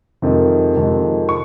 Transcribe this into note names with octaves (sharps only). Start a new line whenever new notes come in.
F2 C3 D#3 G#3
F2 C3 D#3 G#3
C#6